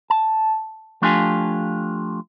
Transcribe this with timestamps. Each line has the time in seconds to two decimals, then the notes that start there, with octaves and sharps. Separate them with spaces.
0.10 A5
1.02 F3 A3 D4 F4 G4 G#5